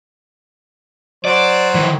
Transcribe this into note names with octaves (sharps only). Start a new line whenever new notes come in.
F#3 C5 D5
D#3 E3